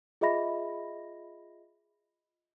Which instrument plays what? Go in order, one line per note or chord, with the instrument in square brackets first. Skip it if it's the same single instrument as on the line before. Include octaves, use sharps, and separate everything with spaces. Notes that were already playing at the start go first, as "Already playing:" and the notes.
[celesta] F4 G#4 D#5 E5 B5 A#6